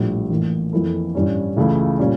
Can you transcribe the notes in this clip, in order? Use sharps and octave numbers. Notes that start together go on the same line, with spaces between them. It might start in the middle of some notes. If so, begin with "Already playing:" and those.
Already playing: A#1 A2 G3
A1 A2 E3 A#3
F2 E3 A#3 E4 A4
A1 G2 E3 G3 C#4
C#2 C#3 E3 A3 E4
A#2 G3 C#4